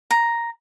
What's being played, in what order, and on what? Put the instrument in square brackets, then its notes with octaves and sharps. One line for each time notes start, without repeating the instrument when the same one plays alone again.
[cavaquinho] A#5